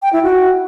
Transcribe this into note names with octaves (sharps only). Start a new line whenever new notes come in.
G5
E4
F#4